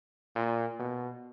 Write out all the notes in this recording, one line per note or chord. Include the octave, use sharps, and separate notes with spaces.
A#2
B2